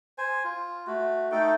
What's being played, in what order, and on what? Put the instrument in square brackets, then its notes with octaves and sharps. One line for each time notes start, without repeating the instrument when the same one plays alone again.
[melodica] C5 G#5
F4
A3 F#4
A3 D#4 A4 G5